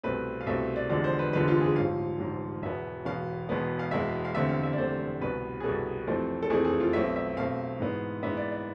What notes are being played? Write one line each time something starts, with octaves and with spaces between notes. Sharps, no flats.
C2 B2 A3 C4 B4
F5
C2 B2 A3 C4 E5
D5
F1 E2 D3 F3 G#3 D5
C5
B4
F1 E2 D3 F3 G#3 B4
F4
G#4
A1 G#2 F3 F5
A1 G#2 F3
E1 E2 B2 B3 E5
E1 E2 B2 B3 F5
E1 E2 B2 G#3 B3
F5
E1 E2 B2 G#3 B3 E5
F5
F1 E2 D3 A3 C4 E5
F5
E5
D5
F1 E2 D3 A3 C4 C5
C2 B2 B3 B4
G#4
C2 B2 B3 A4
F1 F2 E3 A3 C4
A4
F1 F2 E3 A3 C4 G#4
G#4
F4
B1 B2 A3 C4 E5
E5
B1 B2 A3 C4 F5
G#2 E3 G#3 B3
G#2 E3 G#3 B3 E5
D5
D5